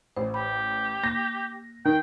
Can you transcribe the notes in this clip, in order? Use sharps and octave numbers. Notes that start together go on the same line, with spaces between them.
A1 C5
G4 B5
A#3 A#6
D#3 G5